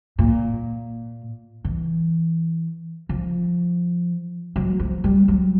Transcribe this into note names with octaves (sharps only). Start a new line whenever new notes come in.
A#2
E3
F3
F#3
F3
G3
F#3